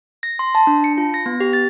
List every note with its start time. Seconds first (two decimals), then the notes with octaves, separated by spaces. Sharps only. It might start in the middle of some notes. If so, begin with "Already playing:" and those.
0.23 A#6
0.39 C6
0.55 A5
0.67 D4
0.84 C#7
0.98 F4
1.14 A#6
1.26 B3
1.40 G4
1.53 A6